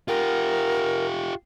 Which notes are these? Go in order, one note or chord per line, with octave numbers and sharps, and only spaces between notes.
F4 G4 A#4